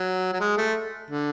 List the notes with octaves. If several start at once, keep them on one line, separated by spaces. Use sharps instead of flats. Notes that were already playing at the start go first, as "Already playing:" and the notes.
Already playing: F#3
F#3
G#3
A3
D3